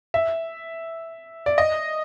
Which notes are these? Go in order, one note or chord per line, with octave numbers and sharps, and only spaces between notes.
E5
D5
D#5